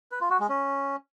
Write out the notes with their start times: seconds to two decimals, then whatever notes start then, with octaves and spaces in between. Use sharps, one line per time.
0.12 B4
0.21 F4
0.30 F#4
0.40 G#3
0.49 C#4